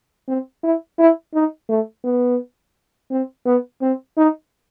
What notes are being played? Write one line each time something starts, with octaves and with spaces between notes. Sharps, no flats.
C4
E4
E4
D#4
A3
B3
C4
B3
C4
D#4